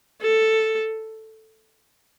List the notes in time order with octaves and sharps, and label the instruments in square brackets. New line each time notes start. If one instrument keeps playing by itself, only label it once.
[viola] A4